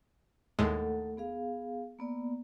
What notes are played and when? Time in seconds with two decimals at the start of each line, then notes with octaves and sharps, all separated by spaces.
0.59 D#2 A2 G#3 A3 A4 F#5
1.17 B3 G#4 F5
1.99 A#3 B3 D5